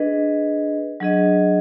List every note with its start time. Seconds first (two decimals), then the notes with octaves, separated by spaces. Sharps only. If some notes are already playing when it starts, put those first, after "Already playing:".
Already playing: D4 G#4 B4 D#5
1.00 F#3 D4 G#4 D#5